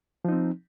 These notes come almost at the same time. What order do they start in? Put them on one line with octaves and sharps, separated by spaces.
F3 D#4 C4